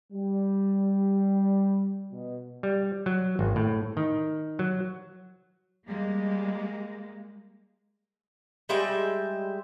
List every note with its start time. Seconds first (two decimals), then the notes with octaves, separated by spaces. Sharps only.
0.13 G3
2.12 B2
2.63 G3
3.06 F#3
3.39 G#1
3.56 A2
3.97 D#3
4.59 F#3
5.86 G3 G#3 A#3
8.69 G3 G#3 E5 G5